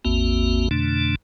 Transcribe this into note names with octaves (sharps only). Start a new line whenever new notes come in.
A1 E2 A#3 C4 F#4
F2 B2 D3 A3 D4